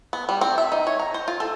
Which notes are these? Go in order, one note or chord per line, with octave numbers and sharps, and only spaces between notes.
B3
G3
C4
E5
D#4
C#5
A#5
C5
F4
A4